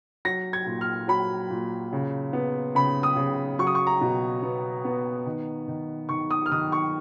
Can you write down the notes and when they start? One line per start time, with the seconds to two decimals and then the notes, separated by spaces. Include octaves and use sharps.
0.25 F#3 A#6
0.53 G#6
0.66 A#2
0.81 F6
1.08 F#3 B5
1.50 A#2
1.93 C#3
2.33 B3
2.75 C#3 B5
3.03 D#6
3.17 C#3
3.59 F#3 C#6
3.67 D#6
3.75 C#6
3.87 A#5
4.01 B2
4.43 B3
4.85 B3
5.26 D#3
5.68 D#3
6.09 D#3 C#6
6.30 D#6
6.46 F6
6.52 D#3 D#6
6.72 C#6